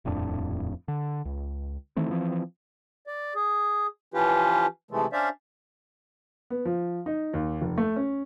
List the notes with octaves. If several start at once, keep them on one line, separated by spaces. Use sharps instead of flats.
D#1 F2 A2 D4
D3
C#2
D#3 E3 A3 C4
E3 F3 C4
D5
G#4
E3 F3 C#4 F4 G4 B4
C3 E3 F3 G#3 A3
C#4 D4 C5 D5 E5 F5
B3
F3
D#4
D#2
F1
A3
C#4